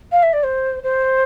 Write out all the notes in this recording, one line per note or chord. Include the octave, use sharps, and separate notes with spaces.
F5
E5
D5
C5
C5